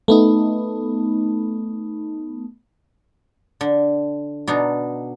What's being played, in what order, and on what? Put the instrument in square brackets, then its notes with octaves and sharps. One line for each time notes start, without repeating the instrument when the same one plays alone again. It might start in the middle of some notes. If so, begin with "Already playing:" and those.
[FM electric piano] A3 B3 D#4
[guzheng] D3
B2 D4 D#4